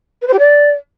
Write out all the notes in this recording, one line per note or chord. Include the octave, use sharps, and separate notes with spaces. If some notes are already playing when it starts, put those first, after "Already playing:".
B4
C5
G4
D5